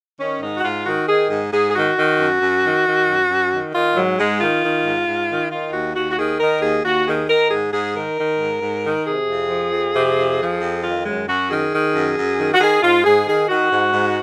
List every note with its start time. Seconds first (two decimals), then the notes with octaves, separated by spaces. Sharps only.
0.20 D#3 C#4
0.42 G#2 D#4
0.57 F#4
0.64 G#2 F4
0.86 D#3 F#4
1.08 D#3 G#4
1.30 G#2 G#4
1.52 G#2 G#4
1.70 G#4
1.75 D#3 F#4
1.97 D#3
2.19 F#2
2.41 F#2
2.64 D#3
2.86 D#3
3.08 F#2
3.29 F#2
3.52 D#3
3.74 D#3 F4
3.96 G#2 F#3
4.19 G#2 G#3
4.41 D#3 F4
4.63 D#3
4.85 G#2
5.07 G#2
5.29 D#3
5.51 D#3 F4
5.73 D#2 F#4
5.95 D#2 F#4
6.11 F#4
6.18 D#3 G#4
6.40 D#3 A#4
6.62 D#2 G#4
6.84 D#2 F#4
7.07 D#3 G#4
7.29 D#3 A#4
7.50 G#2 G#4
7.73 G#2 G#4
7.95 D#3 A#4
8.17 D#3
8.39 G#2
8.62 G#2
8.84 D#3
9.06 C3 G#4
9.28 F2
9.50 F3
9.72 F2
9.94 C3
10.16 F2
10.39 F3
10.61 F2
10.83 D#3 F4
11.05 F#2 G#3
11.27 F#2 F#4
11.49 D#3 G#4
11.72 D#3
11.94 F#2
12.17 F#2
12.38 D#3
12.54 F#4
12.60 D#3 G#4
12.82 G#2 F4
13.04 G#2 G#4
13.26 D#3 G#4
13.48 D#3 F#4
13.72 G#2
13.93 G#2